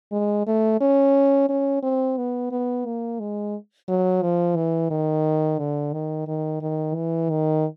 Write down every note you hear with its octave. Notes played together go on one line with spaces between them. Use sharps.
G#3
A3
C#4
C#4
C4
B3
B3
A#3
G#3
F#3
F3
E3
D#3
D3
D#3
D#3
D#3
E3
D#3